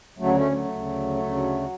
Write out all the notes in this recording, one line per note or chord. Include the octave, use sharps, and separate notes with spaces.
D2 C#3 F#3 A3
A3 C#4
F#3 A3
D2 C#3
D2 C#3